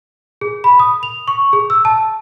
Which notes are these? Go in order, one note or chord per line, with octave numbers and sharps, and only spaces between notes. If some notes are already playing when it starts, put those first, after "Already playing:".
G#4
B5
D#6
F7
C#6
G#4
E6
A5